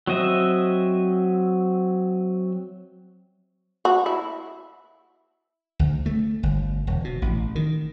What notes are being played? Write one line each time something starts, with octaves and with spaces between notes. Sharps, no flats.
F#3 C4 D#5 E5
F#4
E4
D2
A3
G1
E1
B2
A1
D#3